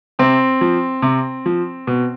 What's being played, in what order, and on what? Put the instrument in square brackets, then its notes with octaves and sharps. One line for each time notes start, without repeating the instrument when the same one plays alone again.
[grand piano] C3 C4
F3
C3
F3
B2